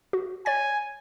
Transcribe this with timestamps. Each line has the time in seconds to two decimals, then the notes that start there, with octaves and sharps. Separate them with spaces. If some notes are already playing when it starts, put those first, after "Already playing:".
0.13 F#4
0.46 C#5 G#5 A6